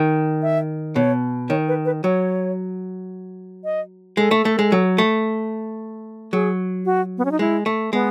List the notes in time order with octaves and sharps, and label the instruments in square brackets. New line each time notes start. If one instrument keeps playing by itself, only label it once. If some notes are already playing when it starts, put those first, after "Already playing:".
Already playing: [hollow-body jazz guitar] D#3
[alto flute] E5
[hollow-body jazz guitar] B2 [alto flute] C#5
[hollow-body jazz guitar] D#3 [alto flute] C#5
[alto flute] B4
B4
[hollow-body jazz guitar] F#3 [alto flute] C#5
[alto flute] D#5
[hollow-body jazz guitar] G#3 [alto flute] A4
[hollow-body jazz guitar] A3
A3
G#3
F#3
A3
[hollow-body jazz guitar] F#3 [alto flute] G#4
[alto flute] F#4
B3
C#4
D#4
[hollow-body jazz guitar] G#3 [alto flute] E4
[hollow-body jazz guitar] A3
[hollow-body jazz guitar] G#3 [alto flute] B3